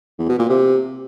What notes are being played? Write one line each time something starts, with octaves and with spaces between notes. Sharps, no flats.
E2
B2
A#2
C3